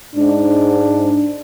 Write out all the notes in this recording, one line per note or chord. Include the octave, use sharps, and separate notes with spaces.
G#2 D4